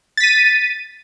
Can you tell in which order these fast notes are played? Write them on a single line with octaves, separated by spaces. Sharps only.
A6 B6 D#7